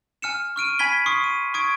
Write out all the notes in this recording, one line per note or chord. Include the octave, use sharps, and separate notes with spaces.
G#5 F6 C#7 E7
C#6 F6 D7 D#7
G#5 B5 G#6 B6 G7
C6 C#6 D#6 C7
D#7
C#6 D#6 G#6 D7